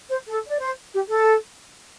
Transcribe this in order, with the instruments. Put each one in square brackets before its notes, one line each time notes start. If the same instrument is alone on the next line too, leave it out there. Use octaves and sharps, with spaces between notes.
[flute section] C5
A4
D5
C5
G4
A4